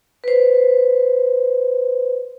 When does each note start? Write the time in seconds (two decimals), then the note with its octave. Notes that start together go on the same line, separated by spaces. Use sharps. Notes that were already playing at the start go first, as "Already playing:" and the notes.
0.24 B4 C5